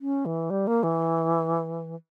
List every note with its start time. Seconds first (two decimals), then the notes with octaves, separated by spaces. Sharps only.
0.01 C#4
0.26 E3
0.50 G3
0.67 A#3
0.83 E3